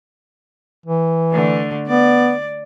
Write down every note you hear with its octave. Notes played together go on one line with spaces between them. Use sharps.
E3
D3 A3
B3 D5